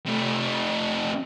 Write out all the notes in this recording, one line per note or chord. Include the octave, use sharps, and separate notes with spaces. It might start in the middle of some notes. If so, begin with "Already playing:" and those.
C3 A3